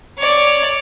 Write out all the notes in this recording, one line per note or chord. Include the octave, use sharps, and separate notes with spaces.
C#5 D5